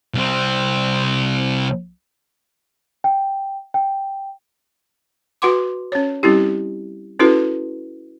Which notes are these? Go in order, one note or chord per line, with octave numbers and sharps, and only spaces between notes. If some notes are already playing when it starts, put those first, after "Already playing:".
C2 C4
G5
G5
F#4 B4 F#5 C6 D6
C#4 C#5
G3 C4 C#4 E4 G4
C#4 E4 F#4 A4 B4